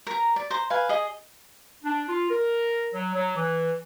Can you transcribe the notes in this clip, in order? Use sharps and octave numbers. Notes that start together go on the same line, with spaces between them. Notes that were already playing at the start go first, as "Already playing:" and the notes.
A#4 A#5
D5
C5 A#5
B4 F5 G#5
G#4 D#5
D4
F4
A#4
F#3
F#3
E3